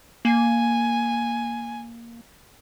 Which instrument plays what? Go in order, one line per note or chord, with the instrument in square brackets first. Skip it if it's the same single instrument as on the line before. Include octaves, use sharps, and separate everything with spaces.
[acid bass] A#3 [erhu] G#5